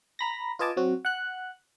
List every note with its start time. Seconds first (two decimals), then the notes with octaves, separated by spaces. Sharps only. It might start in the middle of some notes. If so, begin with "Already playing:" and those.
0.19 A#5 B5 A#6
0.59 F4 B4 D#5 G#5 A5 D6
0.77 F#3 C4 F#4
1.05 F#5 F#6